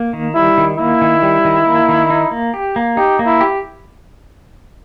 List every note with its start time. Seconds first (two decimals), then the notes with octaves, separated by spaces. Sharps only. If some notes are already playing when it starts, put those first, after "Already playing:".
Already playing: A#3
0.13 D#3
0.35 G3 E4
0.58 D#3
0.78 A#3 E4
1.01 D#3
1.22 G3
1.45 D#3
1.66 A#3
1.89 D#3
2.10 D#4
2.31 A#3
2.54 G4
2.76 A#3
2.97 D#4 G4
3.19 A#3
3.26 E4
3.41 G4